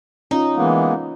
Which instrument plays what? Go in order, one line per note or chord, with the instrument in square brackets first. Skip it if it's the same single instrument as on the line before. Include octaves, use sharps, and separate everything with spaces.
[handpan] C#4 F4 [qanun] D#4
[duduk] E3 [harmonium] G#3 A#3 B3